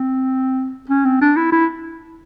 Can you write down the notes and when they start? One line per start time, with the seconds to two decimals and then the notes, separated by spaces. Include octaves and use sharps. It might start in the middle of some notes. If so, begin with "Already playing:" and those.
Already playing: C4
0.89 C#4
1.05 C4
1.21 D4
1.36 E4
1.52 E4